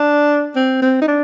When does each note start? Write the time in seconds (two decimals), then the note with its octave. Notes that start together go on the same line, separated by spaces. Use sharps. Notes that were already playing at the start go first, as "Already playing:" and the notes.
Already playing: D4
0.56 C4
0.82 C4
1.02 D#4
1.08 D4